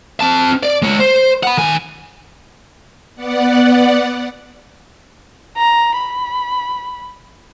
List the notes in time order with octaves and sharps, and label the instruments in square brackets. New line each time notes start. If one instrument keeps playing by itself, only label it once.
[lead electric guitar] C4 A5
D5
G#3 C#5
C5
F#5 B5
D#3 G#5
[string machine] B3 D5 F#5
[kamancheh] A#5
B5